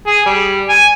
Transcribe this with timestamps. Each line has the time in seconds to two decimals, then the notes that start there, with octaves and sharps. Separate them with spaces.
0.06 G#4
0.26 G3
0.69 G#5